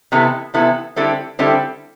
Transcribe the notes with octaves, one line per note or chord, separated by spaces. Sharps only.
C3 E3 B3 E4 A4
C3 E3 B3 E4 A4
D3 G3 C4 E4 A4
D3 G3 C4 E4 A4